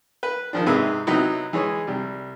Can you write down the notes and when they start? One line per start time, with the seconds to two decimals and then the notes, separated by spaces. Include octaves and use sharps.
0.23 B4
0.53 D#3 F3 D4
0.66 G#2 C3 G#4 B4 E5 D#6
1.07 C3 F#3 B3 D#4 E4
1.53 E3 G#3 G#4 C#5
1.87 C2 G3